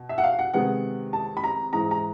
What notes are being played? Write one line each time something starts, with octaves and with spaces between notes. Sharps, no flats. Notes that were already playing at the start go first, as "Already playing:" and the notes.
Already playing: B2
E5
F#5
F5
F#5
C3 D#3 G#3 B3 F#5
A5
B5
A#5
G#2 E3 G#3 A#5
A#5